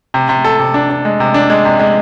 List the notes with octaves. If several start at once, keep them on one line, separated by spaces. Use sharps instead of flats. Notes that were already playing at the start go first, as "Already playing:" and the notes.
C3
C3
A4
C3
D4
D4
G#3
C3
D4
G#3
C3
G#3